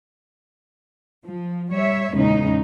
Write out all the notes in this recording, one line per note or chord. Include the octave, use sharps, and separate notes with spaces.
F3
G3 C#5 E5
E2 A#2 C#3 G#3 C#4 D#4